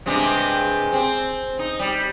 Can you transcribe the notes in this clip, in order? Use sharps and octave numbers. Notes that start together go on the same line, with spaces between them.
G2 C3 G#3
C4
D#4
G3